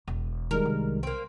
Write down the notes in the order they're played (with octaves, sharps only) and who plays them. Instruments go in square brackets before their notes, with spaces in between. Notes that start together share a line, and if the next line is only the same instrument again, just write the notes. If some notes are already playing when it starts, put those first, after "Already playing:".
[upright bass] E1
[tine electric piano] D#3 G3 G#3 [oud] A#4
[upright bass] C2
[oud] A#3 C4